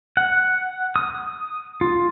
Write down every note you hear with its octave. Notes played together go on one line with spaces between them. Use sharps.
F#5
D#6
F4